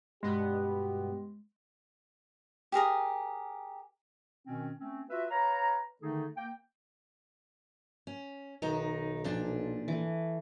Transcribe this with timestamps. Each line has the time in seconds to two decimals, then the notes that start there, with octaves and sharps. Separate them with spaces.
0.23 G2 B2 G#3 B3 G4
2.72 G4 G#4 A#4 D#6
4.46 B2 D#3 C4 C#4
4.79 A3 C4 C#4
5.10 F4 F#4 B4 E5
5.31 B4 C#5 F5 A#5
6.02 D3 D#3 A3 D#4 G#4 A4
6.37 A#3 G5
8.07 C#4
8.62 B1 D#3 B3 D#4 A#5
9.24 A#2 F3 D4
9.88 E3 A3